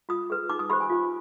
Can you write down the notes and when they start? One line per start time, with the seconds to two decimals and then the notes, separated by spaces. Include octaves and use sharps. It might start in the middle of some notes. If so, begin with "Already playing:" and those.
0.09 F4 D#6
0.30 G#4 B4
0.49 D#4 D6
0.59 D#6
0.70 G4 C5 B5
0.80 G#5
0.90 F4